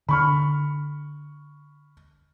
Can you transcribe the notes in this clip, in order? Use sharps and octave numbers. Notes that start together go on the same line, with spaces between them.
D3 B5 C#6 F6